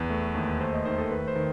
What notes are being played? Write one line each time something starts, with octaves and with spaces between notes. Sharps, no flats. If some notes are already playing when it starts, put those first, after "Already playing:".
Already playing: E2 B4
A3
D#2
A3 C5
D#5
D#3 C5
A4
A3 B4
C5
D#3